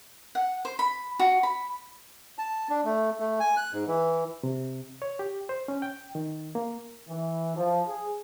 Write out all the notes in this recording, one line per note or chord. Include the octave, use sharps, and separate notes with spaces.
F#5
C5
B5
F#4
B5
A5
D4
A3
A3
G#5
F#6
G#2
E3
C3
C#5
G4
C5
C#4
G5
D#3
A#3
E3
F3
G#4